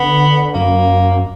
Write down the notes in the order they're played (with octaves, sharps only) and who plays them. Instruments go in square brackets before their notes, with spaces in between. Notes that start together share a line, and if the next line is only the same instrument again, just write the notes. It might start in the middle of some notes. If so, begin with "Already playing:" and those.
Already playing: [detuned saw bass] D3 [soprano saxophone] B3
[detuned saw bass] F#2 [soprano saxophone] A#3